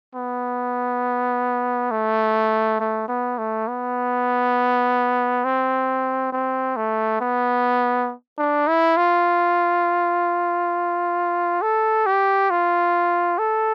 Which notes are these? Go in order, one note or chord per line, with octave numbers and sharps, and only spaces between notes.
B3
A3
A3
B3
A3
B3
C4
C4
A3
B3
D4
E4
F4
A4
G4
F4
A4